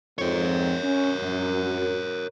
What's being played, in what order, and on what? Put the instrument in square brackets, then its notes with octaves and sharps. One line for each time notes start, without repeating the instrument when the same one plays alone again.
[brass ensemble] F2 G#2 C4 [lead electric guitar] A#4 C#5
[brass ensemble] C#4
F#2